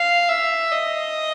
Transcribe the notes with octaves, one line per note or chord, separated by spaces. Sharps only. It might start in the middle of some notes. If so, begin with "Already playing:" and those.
Already playing: F5
E5
D#5